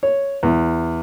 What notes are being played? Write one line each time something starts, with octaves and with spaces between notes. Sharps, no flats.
C#5
E2